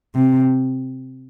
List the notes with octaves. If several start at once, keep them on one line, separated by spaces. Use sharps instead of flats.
C3